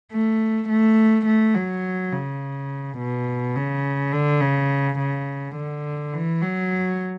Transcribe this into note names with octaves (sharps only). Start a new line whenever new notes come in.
A3
A3
A3
F#3
C#3
B2
C#3
D3
C#3
C#3
D3
E3
F#3